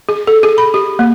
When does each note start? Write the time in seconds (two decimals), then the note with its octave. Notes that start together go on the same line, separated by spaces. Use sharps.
0.09 G#4
0.27 A4
0.43 G#4
0.58 B5
0.74 G4
0.99 A#3